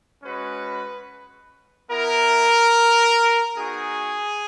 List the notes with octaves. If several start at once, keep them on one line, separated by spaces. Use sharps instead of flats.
G#3 C#4 F#4 B4
B3 E4 A#4
B3 D#4 F#4 G#4